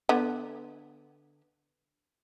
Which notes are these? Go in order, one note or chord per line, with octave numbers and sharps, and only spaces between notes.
D3 B3